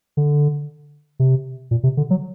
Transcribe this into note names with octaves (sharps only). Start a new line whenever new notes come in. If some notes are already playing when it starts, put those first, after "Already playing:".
D3
C3
A#2
C3
D3
F#3